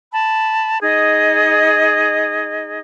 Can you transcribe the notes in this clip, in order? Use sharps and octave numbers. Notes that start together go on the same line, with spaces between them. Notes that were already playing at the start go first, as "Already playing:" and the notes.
A5 B5
D#4 G#4 D#5